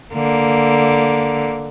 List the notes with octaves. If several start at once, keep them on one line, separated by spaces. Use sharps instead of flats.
D3 A#3